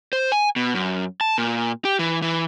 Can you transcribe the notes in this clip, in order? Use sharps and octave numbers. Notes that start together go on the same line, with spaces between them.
C5
G#5
B2
F#2
A5
A#2
G4
E3
E3